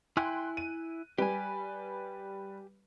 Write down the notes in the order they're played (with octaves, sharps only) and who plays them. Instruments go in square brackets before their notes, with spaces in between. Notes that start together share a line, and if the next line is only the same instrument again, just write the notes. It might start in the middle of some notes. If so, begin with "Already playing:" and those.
[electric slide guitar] E4 G#5 [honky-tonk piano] G5 C6 F#6
[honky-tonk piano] D#7
[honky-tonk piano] G3 B4 [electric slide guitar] G4 G#5